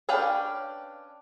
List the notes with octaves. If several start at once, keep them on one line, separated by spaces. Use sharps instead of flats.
C#4 D4 B4 F5 G5